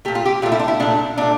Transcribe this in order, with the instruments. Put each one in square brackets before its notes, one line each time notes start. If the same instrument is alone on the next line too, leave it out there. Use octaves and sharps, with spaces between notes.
[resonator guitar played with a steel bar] A#2 A3 G4
F4
G4
A#2 A3 F4
E4
D4
E4
A#2 A3 D4
A#2 A3 D4